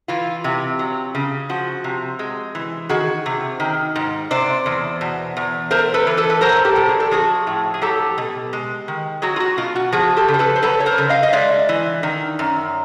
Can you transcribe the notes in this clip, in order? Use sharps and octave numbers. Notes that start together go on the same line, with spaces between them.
E3 F4
C3
F#3
C#3
F3 F#4
C3
G#3
E3
D#3 F#4 G#4
C3
D#3
G#2
C3 C5 D5
E2
B2
E2
A3 A#4 C5
A4 B4
E3
A4 B4
B4
F#3 A#4 C5
G4 A4
A#2
G#4
A4
F3 F#4 G#4
A2
G#4
F#3 G4 A4
B2
G#3
D#3
F#3 F#4 G#4
F4
F#4
B2 F4
F#4
F3 F#4 G#4
G4 A4
C#3
C5
A4 B4
C5
F#3 A4 B4
C#5
A#4 C5
C#3
D#5 F5
D#5
G#3 D5 E5
E3
D#3
F#2